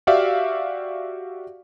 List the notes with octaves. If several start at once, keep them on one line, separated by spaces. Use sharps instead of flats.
F#4 G4 D5 E5 F5